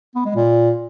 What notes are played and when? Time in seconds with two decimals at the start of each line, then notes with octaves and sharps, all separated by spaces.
0.15 B3
0.25 G#3
0.35 A#2